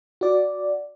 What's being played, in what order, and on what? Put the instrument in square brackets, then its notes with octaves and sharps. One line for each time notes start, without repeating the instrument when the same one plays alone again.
[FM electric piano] F#4 D5